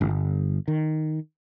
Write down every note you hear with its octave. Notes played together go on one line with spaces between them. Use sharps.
G1
D#3